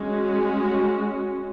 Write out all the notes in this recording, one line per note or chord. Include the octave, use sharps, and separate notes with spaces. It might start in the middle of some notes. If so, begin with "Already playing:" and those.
Already playing: G#3 C#4 F#4